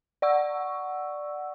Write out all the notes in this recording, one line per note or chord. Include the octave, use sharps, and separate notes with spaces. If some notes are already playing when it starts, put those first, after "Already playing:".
D5 F#5 C#6 E6